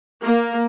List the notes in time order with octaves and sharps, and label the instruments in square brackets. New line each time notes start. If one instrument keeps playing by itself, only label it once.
[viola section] A#3